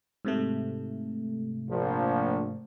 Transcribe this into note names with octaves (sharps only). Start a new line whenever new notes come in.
G#2 C3 A3
A#1 F3